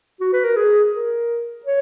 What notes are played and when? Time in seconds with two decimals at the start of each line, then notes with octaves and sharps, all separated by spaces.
0.20 F#4
0.33 B4
0.45 A#4
0.56 G#4
0.94 A#4
1.66 C#5